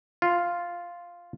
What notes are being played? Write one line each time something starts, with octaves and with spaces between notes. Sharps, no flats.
F4